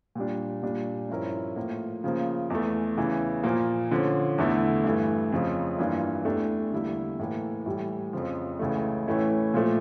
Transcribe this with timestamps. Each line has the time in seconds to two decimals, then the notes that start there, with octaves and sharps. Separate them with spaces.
0.15 A#2 G3 D4
0.63 A#2 G3 D4
1.09 G2 F3 C#4 E4 A#4
1.56 A2 F3 A#3
2.04 C#3 F3 A#3
2.50 E2 E3 A3
2.97 E2 C#3 E3
3.44 A#2 F3 A#3
3.91 D3 F3 C#4
4.38 E2 D3 A3 E4
4.84 G2 E3 A3
5.32 F2 C#3 F3 C#4
5.78 G2 E3 A#3 D4 F4
6.25 E2 E3 A3 D4 G4
6.72 E2 D3 G3 A#3 E4
7.19 A2 E3 A#3
7.66 A2 E3 G3
8.13 F2 C#3 F3
8.59 C#2 C#3 E3 A3
9.07 A2 E3 A3 C#4 E4
9.54 A#2 F3 A3